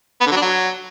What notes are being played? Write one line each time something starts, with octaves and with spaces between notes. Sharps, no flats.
B3
D3
F#3
D4
F#3